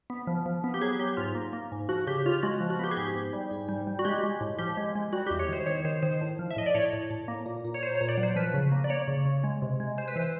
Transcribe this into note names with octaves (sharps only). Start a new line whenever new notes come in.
B3
F3
F3
B3
G4
F#3 G#4
F#3 G4
G#2 F4
A#3
A#3
G#2
F3 F#4
C#3 G4
C#3 F4
G#3 F#4
F3
F#4
B3 G4
G#4
G#2 G4
G#2
G3
G#2
G3
G3
F#4
G#3 G4
G#3
A2
F3 G4
G#3
G#3
G3 F#4
E2 G4
C#5
D#3 C5
D#3 C#5
D#3 C5
D#3 C5
A2
F3
E5
A2 D#5
D5
A2 C#5
A2
A2
A#3
A#2
A#2
C#5
A#2 C5
C#5
A#2
D5
F#3
C5
F3 B4
C#3
A#3
D5
A#3 C#5
C#3
C#3
G#3
C3
G#3
G#3 C5
B4
E3 C5